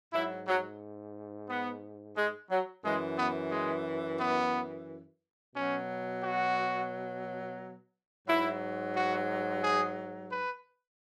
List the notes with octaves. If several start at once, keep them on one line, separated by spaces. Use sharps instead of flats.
G#2 F#3 E4
F#3
B3
G#3
F#3
F#2 E3 G#3
B3
G#3
B3
B2 F#3 C#4
F#4
G#2 F#3 E4
F#4
G#4
B4